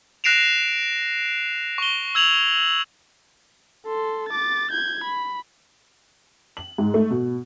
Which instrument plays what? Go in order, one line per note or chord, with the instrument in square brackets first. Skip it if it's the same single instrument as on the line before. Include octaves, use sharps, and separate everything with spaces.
[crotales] F#6 A#6 C7 D7 E7 F7
C#6 G7
E6 G#6 F7 F#7
[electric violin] A4 C6
D6 A6
G6 G#6
B5
[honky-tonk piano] F#7
G#2
A3
B2